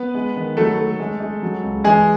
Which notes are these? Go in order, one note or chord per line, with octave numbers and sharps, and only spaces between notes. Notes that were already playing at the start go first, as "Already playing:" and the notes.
Already playing: B3 B4
G#3
D#3
F#3 A3 A4
A3
G#3
G#3
F#3
C#2
E3 G#3 G#4